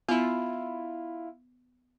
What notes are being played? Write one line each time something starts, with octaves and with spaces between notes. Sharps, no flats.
B3 E4 F4